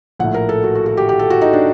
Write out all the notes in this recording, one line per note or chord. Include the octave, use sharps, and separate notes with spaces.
A#1 A2 F#5
A#4
A4
F#4
F#4
F#4
G4
G4
A4
F#4
D#4
D4